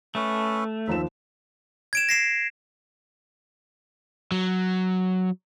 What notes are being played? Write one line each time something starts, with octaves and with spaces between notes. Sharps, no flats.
A3 C#4 A4 B4
D#2 F3 C4 E5 E7
G#6 D7 E7
A#6 C7 E7
F#3